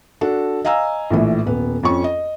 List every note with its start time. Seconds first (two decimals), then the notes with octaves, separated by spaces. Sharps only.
0.21 D4 F#4 A4
0.65 D#5 F5 G#5 A#5 E6
1.11 A#1 A2 E3
1.46 D#1 B3
1.83 F2 C#4 C#6
2.04 D#5